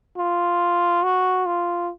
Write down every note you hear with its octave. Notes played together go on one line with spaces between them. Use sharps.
F4
F#4
F4